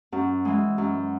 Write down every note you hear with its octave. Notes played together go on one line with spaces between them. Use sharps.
F#2
E3 G#3
F#2